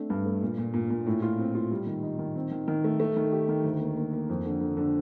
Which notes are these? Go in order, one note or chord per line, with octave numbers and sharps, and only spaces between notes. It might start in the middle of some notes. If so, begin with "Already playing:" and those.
Already playing: A3 C4 D4
G2
A3
A#2
A#2
A#2
A#2
A2
F4
C4
F4
G3
D#3
D#4
D#3
C4
D#3
D#3
A3
A3
D#3
G4
D#3
D2
A#3
A#3
A#3
F2
D3
D3
D3